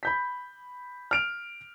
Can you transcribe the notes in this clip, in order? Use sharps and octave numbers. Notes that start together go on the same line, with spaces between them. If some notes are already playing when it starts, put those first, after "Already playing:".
B5 G6 B6
F6 D7 F7